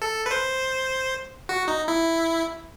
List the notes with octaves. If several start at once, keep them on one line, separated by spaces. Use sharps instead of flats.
A4
B4
C5
F#4
D#4
E4